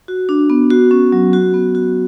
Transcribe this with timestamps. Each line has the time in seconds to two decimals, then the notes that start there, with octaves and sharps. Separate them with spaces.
0.08 F#4
0.29 D4
0.50 B3
0.70 F#4
0.91 C#4
1.12 F#3
1.33 F#4
1.54 B3
1.75 F#4